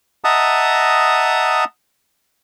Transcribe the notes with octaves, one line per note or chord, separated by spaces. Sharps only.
D#5 E5 F#5 A5 A#5 D#6